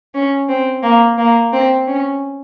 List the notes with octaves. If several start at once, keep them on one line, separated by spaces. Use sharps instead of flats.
C#4
C4
A#3
A#3
C4
C#4